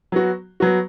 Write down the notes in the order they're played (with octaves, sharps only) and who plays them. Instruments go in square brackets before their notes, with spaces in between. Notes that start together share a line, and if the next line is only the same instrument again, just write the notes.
[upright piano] F#3 B3 F#4
F#3 B3 F#4